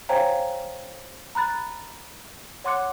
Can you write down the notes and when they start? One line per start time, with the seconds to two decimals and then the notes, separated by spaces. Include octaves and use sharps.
0.09 C5 C#5 F5 G5 G#5 A#5
1.35 A#5 B5 F#6 A6
2.64 C#5 F#5 C6 D6 F#6 C#7